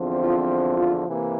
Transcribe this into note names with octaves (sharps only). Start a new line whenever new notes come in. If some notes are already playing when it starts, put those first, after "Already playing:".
Already playing: E2 D3 F3 C4
F4
F4
C3 E3 A#3